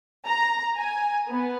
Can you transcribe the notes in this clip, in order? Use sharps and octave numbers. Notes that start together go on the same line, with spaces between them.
A#5
G#5
B3